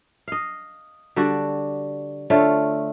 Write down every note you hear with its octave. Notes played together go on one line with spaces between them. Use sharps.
D#5 F5
D3 G3 D4 F#4
D3 A3 F4 C#5